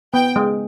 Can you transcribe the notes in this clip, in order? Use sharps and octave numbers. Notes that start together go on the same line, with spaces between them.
B3 G5
G#3